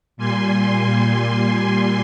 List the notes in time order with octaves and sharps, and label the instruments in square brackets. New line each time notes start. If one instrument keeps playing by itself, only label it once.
[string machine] A#2 G3 G#5 C6